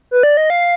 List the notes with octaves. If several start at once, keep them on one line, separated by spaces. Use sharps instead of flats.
B4
D5
D#5
F5